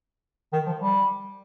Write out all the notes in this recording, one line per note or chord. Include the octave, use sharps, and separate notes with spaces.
D#3
F3
G3